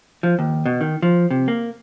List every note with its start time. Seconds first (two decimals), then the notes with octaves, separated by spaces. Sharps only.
0.23 F3
0.39 D#2
0.66 B2
0.81 D#3
1.03 F3
1.31 C3
1.48 A#3